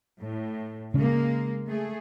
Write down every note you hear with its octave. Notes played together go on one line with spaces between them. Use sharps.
A2
C#3 G#3 A#3 C#4
A3 G#4